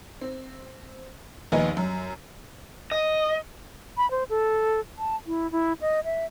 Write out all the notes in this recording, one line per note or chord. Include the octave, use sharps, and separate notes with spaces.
C4
A#1 D#2 B3 D#4 D#5 G#5
F#2
D#5
B5
C5
A4
A5
E4
E4
D#5
E5